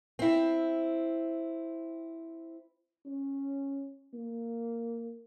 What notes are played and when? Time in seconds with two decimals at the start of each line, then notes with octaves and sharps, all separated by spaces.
0.19 C4 E4
3.06 C#4
4.13 A#3